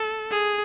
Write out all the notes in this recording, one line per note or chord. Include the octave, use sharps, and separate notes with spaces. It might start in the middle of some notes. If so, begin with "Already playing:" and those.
Already playing: A4
G#4